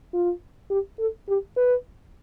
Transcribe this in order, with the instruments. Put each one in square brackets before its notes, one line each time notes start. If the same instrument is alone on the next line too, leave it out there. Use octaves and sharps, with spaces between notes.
[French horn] F4
G4
A4
G4
B4